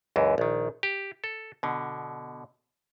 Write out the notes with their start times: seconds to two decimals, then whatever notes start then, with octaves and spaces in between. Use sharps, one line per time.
0.16 C#2 F#2 E3
0.38 A#1 D#3
0.83 G4
1.24 A4
1.63 B2 D3